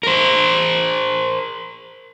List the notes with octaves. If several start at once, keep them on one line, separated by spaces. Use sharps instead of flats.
A#4 C5